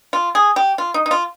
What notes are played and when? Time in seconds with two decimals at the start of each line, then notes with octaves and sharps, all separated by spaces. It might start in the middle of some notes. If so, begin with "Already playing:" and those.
0.13 F4
0.35 G#4
0.56 G4
0.78 F4
0.94 D#4
1.06 D#4
1.11 F4